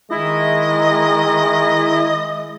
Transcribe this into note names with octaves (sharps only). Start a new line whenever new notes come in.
D#3 G#3 E4 D#5